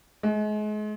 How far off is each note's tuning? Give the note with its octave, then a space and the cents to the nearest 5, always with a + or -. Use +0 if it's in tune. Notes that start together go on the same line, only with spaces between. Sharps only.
G#3 +35